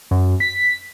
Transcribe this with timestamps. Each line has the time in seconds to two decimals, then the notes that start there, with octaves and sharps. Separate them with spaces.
0.11 F#2
0.40 B6